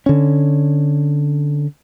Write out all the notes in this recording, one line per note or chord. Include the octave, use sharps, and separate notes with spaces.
D3 C#4